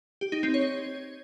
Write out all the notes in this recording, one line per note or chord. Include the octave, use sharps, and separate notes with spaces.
G4
D#4
C4
C#5